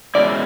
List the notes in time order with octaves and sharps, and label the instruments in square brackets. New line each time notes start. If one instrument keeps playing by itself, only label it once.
[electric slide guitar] B2 G#3 C#4 E4 [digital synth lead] D5